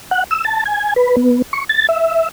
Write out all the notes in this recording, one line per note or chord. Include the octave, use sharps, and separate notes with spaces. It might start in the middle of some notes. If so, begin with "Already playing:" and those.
F#5
E6
A5
G#5
B4
B3
C#6
A6
E5